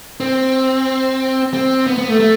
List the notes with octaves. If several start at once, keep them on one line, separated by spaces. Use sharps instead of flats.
C4
C4
B3
B3
A3
A3